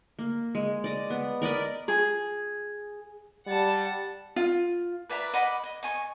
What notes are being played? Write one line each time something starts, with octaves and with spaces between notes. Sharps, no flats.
A#3
G#3
D5 D#5
B3
A#4 D5 D#5 B5
G#4
G3 F#5 A5
F4
B4 D5 E5 A#5
D#5 F#5 B5 D6
D#5
D#5 G#5 C#6